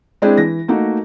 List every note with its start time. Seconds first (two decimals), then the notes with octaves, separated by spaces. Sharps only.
0.22 G#3 C4 D4 E4 G#4
0.37 E3 A#6
0.68 A3 A#3 D#4 F#4